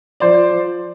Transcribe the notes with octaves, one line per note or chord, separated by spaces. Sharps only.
F3 C5 D5
F3